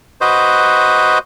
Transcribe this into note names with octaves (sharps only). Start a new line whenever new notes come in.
F#4 B4 C5 D#5